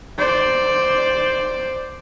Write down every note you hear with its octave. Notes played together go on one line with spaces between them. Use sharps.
C5 D5